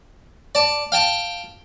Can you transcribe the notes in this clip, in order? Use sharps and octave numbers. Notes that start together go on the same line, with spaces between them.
D5 A5
F5 G5 A5